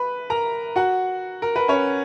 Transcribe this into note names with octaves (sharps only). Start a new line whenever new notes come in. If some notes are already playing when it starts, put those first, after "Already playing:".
Already playing: B4 B5
A#4 A#5
F#4 F#5
A#4
B4
C#4 C#5